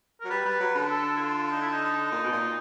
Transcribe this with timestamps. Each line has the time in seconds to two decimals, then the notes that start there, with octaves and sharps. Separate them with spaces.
0.21 F#3 A#4
0.30 G3 B4
0.45 G3
0.60 F#3
0.75 D3
0.91 A4
1.16 E4
1.21 F4
1.51 D#4
1.61 E4
1.72 D#4
2.12 A#2
2.24 B2
2.32 A#2